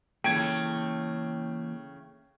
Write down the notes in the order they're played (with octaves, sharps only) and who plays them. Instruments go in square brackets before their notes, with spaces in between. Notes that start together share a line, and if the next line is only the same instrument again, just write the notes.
[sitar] C#3 A3 [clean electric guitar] E3 A#3 [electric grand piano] G5 [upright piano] G#6 D7